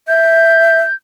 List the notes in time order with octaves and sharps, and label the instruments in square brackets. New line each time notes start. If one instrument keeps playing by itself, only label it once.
[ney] E5 [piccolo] G6